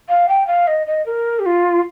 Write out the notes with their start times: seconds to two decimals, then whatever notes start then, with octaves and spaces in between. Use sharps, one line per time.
0.09 F5
0.29 G5
0.47 F5
0.67 D#5
0.87 D#5
1.06 A#4
1.39 G4
1.46 F4